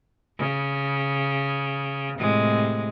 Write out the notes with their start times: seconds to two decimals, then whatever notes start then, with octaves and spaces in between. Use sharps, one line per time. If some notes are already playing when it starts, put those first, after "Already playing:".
0.38 C#3
2.17 A2 C3 G#3